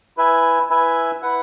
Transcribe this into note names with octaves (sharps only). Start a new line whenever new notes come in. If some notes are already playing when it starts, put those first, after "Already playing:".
E4 B4 E5 G#5
E4 B4 E5 G#5
E4 B4 F#5